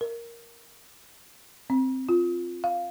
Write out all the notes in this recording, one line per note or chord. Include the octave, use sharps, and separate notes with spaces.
A#4
C4
F4
F5